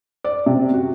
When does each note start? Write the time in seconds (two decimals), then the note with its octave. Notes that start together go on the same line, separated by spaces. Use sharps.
0.24 D5
0.46 C3
0.74 F#4